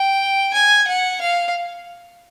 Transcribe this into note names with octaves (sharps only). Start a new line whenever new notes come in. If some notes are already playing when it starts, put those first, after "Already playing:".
Already playing: G5
G#5
F#5
F5